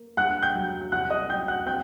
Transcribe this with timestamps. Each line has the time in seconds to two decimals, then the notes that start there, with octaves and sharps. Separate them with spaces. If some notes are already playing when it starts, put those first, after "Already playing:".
Already playing: A#3
0.17 G2 F#5 F#6
0.42 G5 G6
0.55 F#3
0.92 C2 F#5 F#6
1.10 D#5 D#6
1.29 F#3 G5 G6
1.48 F#5 F#6
1.66 C4 G5 G6